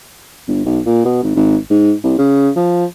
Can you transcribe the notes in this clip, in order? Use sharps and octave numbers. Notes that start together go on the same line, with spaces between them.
G1
B1
A#2
B2
G#1
G#1
G#2
C2
C#3
F3